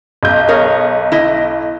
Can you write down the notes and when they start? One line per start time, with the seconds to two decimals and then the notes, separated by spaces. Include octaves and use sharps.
0.23 B1 G6
0.48 G#4 A#4 C#5
1.12 E4 D#5